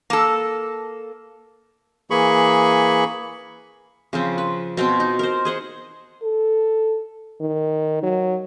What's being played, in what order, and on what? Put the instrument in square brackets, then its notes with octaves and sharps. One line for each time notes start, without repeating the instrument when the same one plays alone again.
[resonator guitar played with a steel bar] A#3 A4
[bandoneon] E3 A#3 G#4 B5 C#6
[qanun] C#3 F3 C4
B4
B2 C4 F4 C6
D#4
A#4 C5
G#4 C5 F#5
[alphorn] A4
D#3
F#3